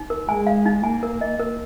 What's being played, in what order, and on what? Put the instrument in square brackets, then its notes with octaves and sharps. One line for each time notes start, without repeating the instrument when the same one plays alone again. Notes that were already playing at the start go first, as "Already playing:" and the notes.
Already playing: [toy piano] D#4
A#4
[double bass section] G#3 [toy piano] G#5
[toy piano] F5
D#4
[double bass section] A#3 [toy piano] G#5
[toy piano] A#4
D#5
A#4